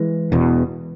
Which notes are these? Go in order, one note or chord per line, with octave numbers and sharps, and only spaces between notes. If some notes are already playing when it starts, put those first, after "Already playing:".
Already playing: E3 G#3
E1 E2 B2